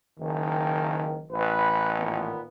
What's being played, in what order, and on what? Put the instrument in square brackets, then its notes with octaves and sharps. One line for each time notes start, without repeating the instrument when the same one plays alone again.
[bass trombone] F#1 [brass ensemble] D#3
[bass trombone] A1 [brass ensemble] B4
[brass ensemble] A#2 D#3 B3